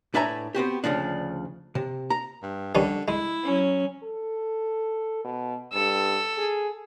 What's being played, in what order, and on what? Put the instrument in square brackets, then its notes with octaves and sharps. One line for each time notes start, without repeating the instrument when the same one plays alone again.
[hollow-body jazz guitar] A2 D4 B4 E5 G#5 A#5
B3 C4 F#4 G4
D2 C#3 F3 D4
C3
A#5
[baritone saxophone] G2
[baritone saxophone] D3 [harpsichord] D#3 G3 C#4
[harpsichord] G#3 [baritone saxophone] E4
[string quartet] F#3 C#4
[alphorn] A4
B2
[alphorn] G2 [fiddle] A4 E6
[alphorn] G#4